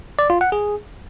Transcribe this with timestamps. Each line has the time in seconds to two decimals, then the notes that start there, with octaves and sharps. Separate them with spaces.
0.19 D5
0.30 F4
0.41 F#5
0.52 G#4